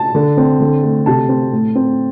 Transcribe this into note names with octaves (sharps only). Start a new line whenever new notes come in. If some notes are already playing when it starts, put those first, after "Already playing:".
Already playing: A5
D3
C4
D3
A3
C3 A5
C4
A2
C4